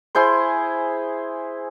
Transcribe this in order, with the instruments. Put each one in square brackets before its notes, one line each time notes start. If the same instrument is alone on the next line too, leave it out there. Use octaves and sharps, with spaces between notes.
[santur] E4 G#4 C5 C6